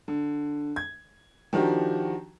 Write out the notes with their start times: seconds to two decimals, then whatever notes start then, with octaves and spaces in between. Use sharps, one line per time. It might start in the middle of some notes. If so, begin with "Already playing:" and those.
0.08 D3
0.76 G#6
1.53 D#3 F3 D4 F#4 G4